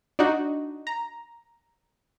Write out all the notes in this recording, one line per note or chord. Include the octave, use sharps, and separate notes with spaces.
D4 D#4 F#4
A#5